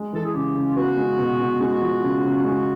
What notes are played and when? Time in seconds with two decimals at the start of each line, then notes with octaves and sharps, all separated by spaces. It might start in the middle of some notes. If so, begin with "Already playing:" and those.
Already playing: G#3
0.13 E3 A4
0.25 G#4
0.34 C#3 G4
0.55 C#3
0.68 F4
0.76 B3 F#4
0.98 G#3
1.18 B2
1.39 B2
1.60 G#3 F#4
1.82 F3
2.02 C#3
2.24 C#3
2.45 G#3